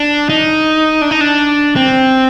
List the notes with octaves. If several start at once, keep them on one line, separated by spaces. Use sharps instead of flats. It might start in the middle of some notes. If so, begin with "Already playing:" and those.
Already playing: D4
D#4
D4
D#4
D4
C4